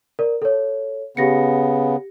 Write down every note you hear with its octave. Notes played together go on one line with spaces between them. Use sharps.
A#4 D5
A4 C#5
C#3 B3 G4 A#6 C#7